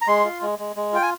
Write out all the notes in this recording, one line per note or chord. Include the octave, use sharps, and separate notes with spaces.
A#5
G#3 C6
F4
G#3
G#3
G#3
F4 G5
G#5